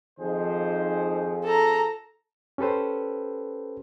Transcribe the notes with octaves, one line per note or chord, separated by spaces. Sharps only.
F2 D#3 F3 D#4 G#4 C5
A4 A#5
C#4 G4 A4 B4 C5